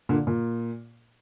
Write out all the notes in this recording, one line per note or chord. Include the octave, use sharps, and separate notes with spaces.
A#2 D3
A#2